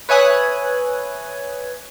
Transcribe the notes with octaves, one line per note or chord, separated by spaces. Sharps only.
B4 C#5 E5 G#5 D#6 F#6